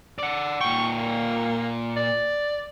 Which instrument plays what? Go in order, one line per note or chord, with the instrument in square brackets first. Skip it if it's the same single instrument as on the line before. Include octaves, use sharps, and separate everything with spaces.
[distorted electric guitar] D5 F#5
[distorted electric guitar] A#2 G5 [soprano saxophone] C#6
[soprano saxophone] A#3
D5